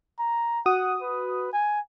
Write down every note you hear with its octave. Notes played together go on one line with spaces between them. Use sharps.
A#5
F#4 F#5 D#6
B4
G#5